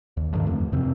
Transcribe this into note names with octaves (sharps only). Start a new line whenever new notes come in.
D#2
G2 D3 D#3 F3
F2 A3
E2 C3 C4